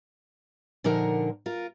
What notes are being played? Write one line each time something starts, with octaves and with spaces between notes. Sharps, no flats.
A#2 D3 F3 D#4 A#4 F#5
F4 A#4